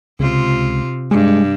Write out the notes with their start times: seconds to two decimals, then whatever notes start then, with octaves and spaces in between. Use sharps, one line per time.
0.20 C#2 C3 F4
1.11 G2 G#3